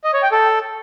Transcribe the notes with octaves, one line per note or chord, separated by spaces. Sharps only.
D#5
C#5
G5
A4